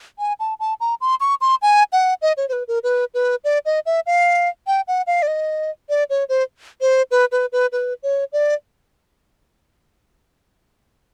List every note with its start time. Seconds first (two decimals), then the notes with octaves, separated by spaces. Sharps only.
0.19 G#5
0.40 A5
0.60 A5
0.80 A#5
1.01 C6
1.20 C#6
1.41 C6
1.62 G#5
1.93 F#5
2.22 D#5
2.37 C#5
2.49 C5
2.53 B4
2.68 A#4
2.84 B4
3.14 B4
3.44 D5
3.66 D#5
3.86 E5
4.06 F5
4.67 G5
4.88 F#5
5.07 F5
5.22 D5
5.28 D#5
5.90 D5
6.10 C#5
6.29 C5
6.81 C5
7.11 B4
7.32 B4
7.52 B4
7.72 B4
8.03 C#5
8.33 D5